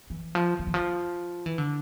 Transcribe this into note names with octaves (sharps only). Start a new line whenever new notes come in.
E3
F3
F3
E3
F3
E3
D3